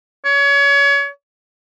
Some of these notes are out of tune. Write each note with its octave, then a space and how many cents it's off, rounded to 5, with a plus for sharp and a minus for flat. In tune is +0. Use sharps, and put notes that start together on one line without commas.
C#5 +30